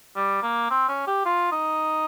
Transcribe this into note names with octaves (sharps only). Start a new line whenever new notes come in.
G3
A#3
C4
C#4
G4
F4
D#4